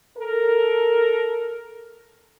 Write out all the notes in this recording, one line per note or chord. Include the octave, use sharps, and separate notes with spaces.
A4 A#4